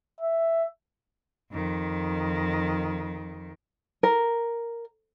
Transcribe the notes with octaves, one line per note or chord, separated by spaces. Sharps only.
E5
F2 D#3
A#4